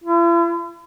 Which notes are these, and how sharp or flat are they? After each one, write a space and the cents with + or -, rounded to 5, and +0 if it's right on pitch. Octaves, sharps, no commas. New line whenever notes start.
E4 +45